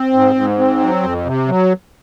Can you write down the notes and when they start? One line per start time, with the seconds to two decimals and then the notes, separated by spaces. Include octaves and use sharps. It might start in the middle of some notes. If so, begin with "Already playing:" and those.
Already playing: C4
0.13 G#2
0.35 G#2
0.59 C4
0.80 F#3
1.03 F2
1.25 C3
1.48 F#3